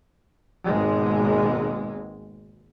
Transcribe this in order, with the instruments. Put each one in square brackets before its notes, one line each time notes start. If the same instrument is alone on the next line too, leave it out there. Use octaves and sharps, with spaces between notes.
[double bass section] G#1 D#2 B2 G#3